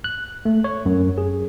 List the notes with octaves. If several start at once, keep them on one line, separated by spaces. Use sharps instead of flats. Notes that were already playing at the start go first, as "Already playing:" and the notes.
F#6
A3
C#5
F#2
G#4